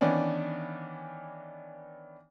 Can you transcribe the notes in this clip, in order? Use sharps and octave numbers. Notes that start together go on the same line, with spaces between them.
D#3 E3 B3 C#4 D4